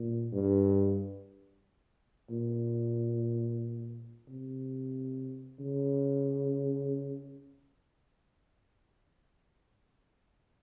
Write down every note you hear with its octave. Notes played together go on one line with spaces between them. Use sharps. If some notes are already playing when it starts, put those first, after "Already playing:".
Already playing: A#2
G2
A#2
C3
C#3